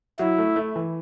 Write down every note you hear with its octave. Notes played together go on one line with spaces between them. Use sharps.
F#3 E4
A3
A3
E3